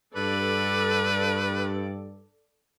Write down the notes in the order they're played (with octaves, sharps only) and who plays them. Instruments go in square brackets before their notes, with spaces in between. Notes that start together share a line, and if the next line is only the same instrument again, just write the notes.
[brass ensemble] G2 [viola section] A4 D5 [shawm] B4